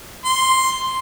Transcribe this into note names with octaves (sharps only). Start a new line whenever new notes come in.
C6